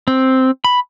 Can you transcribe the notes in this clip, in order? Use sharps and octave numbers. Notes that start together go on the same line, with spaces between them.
C4
B5